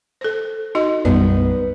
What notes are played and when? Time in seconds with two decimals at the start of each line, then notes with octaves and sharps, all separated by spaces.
0.21 A4 C5
0.75 D#4 F#4 D#5
1.05 B1 F#2 G3 B3 D#4 D5